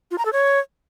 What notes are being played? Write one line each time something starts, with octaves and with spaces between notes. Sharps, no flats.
F4
A#5
A4
C#5